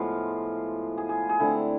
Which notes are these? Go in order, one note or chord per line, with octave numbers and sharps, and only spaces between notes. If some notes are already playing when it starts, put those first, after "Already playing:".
Already playing: A2 F3 G#3 B3 F4
G#4
G#4
G#4
D3 A3 C4 E4